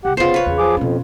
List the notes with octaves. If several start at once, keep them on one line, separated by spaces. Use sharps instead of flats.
C2 G4 F#5
F1 F2 C#3 B3 F4 C5
B4 C#5
E2 C#3
F3 G#4 D6
F2 B2 C#4